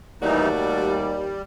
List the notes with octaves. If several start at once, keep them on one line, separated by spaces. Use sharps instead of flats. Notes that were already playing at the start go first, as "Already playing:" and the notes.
D#2 E3 G3 A3 D#4 F#4 D5
G3